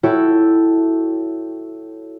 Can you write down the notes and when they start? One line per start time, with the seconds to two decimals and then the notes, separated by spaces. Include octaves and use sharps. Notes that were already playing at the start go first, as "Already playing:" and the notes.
0.03 E4 F#4 A4 C#5 G5 E6